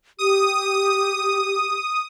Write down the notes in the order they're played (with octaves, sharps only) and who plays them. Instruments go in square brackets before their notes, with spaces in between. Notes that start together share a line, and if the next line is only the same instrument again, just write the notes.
[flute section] G4 [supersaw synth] D#6